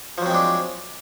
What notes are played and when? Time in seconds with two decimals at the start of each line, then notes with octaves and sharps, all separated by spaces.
0.18 F3
0.22 F#3
0.26 C4
0.30 G#3
0.34 D4